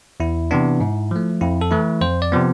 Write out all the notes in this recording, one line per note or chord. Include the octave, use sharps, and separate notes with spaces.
E2 E4
C3 E3 B3 D4
G#2
F3 A3
F2 E4
A4
E3 A3 E4
F2 C5
D5
C3 F3 B3